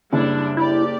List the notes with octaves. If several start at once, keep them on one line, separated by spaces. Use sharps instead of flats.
F#1 G3 D4 E4
E4 G4 D5